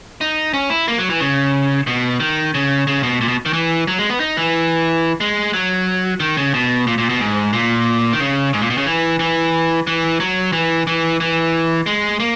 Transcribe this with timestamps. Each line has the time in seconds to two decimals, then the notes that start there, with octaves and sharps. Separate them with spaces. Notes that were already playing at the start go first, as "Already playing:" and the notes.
0.21 D#4
0.54 C#4
0.70 E4
0.88 A#3
0.98 F#3
1.10 E3
1.20 C#3
1.87 B2
2.20 D#3
2.54 C#3
2.87 C#3
3.03 B2
3.21 A#2
3.28 B2
3.46 D#3
3.53 E3
3.87 F#3
3.99 G#3
4.09 B3
4.20 D#4
4.37 E3
5.21 G#3
5.53 F#3
6.20 D#3
6.37 C#3
6.54 B2
6.87 A#2
6.98 A#2
7.10 B2
7.20 G#2
7.53 A#2
8.13 D#3
8.20 C#3
8.53 G#2
8.62 A#2
8.70 B2
8.78 C#3
8.86 E3
9.19 E3
9.87 E3
10.20 F#3
10.53 E3
10.87 E3
11.20 E3
11.86 G#3
12.20 A#3